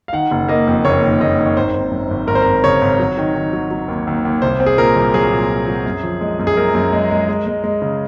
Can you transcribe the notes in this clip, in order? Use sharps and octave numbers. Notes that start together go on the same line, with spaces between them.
F5
D#3 F#5
F#1
A#3 D#5
F2
F#1 C#5
D#3
F#1 D#5
D#3
C#5
G#1 C5
G#1
F#2
G#1
G#1 A#4
C5
G#1 A#4
C#3 C#5
G#1
F#3
D#3
D#3
F#3
F#3
D#2
D#2
D#2
C2 C5
C4
G#4
A#2 A#4
C2
F#3 G#4
A#2
A#2
F#3
F#2
F3
G#3
F#2
G#4
F#2 A#4
F#2
G#3
G#3
G#3
G#3
G#3
C#3